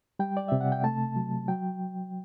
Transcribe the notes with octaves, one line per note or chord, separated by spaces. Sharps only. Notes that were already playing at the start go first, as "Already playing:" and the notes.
G3 G5
D5
C3 E5
F#5
G5
A3 A5
F#3
F#3 G5